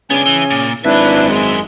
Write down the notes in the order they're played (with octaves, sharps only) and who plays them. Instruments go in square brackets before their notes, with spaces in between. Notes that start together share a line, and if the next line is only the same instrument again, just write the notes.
[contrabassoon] C#3 [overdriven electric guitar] B3 D4 [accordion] G#5
[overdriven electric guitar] E3
A#2
[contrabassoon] G#1 [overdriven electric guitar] F#2 E5 [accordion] D4 E4 B4
[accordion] G#3